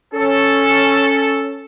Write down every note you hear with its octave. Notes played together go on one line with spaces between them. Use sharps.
C#4 A4